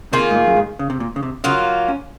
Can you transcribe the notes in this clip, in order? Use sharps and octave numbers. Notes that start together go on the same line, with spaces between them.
C3 D#3 A#3 F4 G#4
G#2
A#2
F#2
G#2
C#3
C3
A#2
C#3
C3
C#3 F#3 A#3 F4
C#4